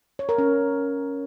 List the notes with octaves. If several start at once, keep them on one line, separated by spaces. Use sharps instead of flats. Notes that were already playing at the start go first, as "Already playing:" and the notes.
C#5
A#4
C#4